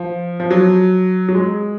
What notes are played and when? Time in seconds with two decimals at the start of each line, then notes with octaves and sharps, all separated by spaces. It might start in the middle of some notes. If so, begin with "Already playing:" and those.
Already playing: F3
0.40 F3
0.51 F#3
1.29 F#3
1.34 G#3